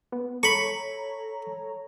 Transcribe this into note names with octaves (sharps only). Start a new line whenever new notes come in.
B3
A4 C#5 A#5 B5 C#6